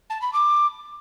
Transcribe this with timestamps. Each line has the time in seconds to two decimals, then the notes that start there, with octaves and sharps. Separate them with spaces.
0.10 A5
0.22 B5
0.33 D6